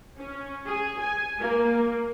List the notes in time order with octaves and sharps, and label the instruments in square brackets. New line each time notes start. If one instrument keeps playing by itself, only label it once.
[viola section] C#4
G#4
G#5
A#3